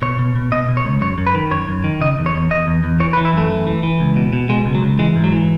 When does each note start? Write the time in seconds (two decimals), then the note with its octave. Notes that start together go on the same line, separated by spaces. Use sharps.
0.02 B2 C#5
0.19 B2
0.36 B2
0.52 B2 D#5
0.69 B2
0.77 C#5
0.85 C#2
1.01 F#2 C#5
1.18 F#2
1.27 B4
1.35 D#3
1.51 F#2 C#5
1.68 F#2
1.84 D#3
2.01 C#3 D#5
2.18 E2
2.26 C#5
2.34 E2
2.51 E2 D#5
2.67 E2
2.84 E2
3.00 E3 C#5
3.13 B4
3.17 E3
3.25 E4
3.33 F#2 A3
3.50 E3
3.67 E3
3.83 E3
4.00 C#2
4.16 B2
4.33 B2
4.49 B2 G#3
4.66 C#2
4.75 F#3
4.83 C#2
4.99 E3 G#3
5.16 G#2
5.24 F#3
5.32 E3